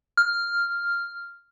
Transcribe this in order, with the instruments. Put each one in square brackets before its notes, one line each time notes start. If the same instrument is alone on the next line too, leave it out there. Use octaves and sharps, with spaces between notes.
[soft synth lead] F6